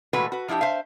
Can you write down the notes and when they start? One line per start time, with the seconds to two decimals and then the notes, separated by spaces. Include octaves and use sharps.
0.13 A#2 E3 G#3 A3 F#4 B4
0.32 F#4 B4
0.48 F3 D4 E4 F#4 G4
0.61 C5 E5 F5